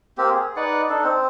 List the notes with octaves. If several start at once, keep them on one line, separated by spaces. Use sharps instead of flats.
A#3 C4 G4
G#4
D#4 B4 D5 F#5
D4 D#4 A4
C4